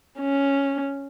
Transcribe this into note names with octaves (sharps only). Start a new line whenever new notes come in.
C#4